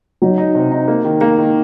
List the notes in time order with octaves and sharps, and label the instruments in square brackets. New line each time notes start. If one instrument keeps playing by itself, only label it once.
[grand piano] F#3 [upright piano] D#4
[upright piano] D#4
C3
D#4
A#3
D#3
A#3
D#3